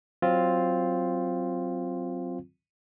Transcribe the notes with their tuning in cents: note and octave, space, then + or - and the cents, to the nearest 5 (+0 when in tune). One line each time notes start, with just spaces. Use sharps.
F#3 +0 C4 +0 F4 +0